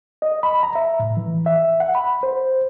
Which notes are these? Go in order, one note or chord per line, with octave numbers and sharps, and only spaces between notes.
D#5
B5
A#5
E5
A2
E3
E5
F#5
B5
C5